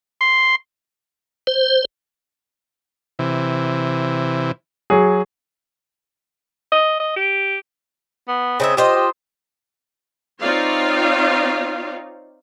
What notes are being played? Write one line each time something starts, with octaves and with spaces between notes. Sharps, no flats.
C6
C5
C3 E3
F#3 G#4
D#5
D#5
G4
B3
C#3 C4 D#5 E5
F4 G4 C5 D#5
G4
C4 D#4 F4 C#5 D5 F5